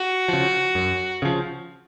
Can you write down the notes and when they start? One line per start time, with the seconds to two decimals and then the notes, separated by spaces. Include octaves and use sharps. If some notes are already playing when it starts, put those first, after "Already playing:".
Already playing: F#4
0.28 C#3 F3
0.75 F#2
1.22 C#3 F3